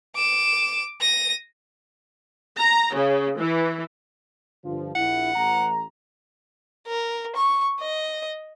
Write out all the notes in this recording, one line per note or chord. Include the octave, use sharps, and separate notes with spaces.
D6 E7
A#6 D#7
A#5
C#3
E3
G2 D3 F3
A#1 E4 F#5
A1 A#5
A#4
C#6
D#5